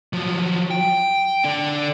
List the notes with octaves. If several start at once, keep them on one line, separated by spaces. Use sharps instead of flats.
F3 F#3
G5
D3 D4